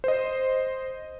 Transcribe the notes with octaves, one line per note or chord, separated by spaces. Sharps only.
C5 D#5